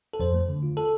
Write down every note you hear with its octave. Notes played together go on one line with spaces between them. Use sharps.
A4
F2 C5
A3
D3
F4
A4